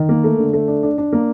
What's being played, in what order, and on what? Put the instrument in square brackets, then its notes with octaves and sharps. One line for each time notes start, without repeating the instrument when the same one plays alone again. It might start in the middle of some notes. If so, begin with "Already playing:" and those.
Already playing: [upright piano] D#3
A#3
A3
D3
A3
D4
D4
D4
A#3